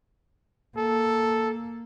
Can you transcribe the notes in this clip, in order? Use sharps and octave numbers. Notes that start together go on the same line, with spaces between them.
A#3 A4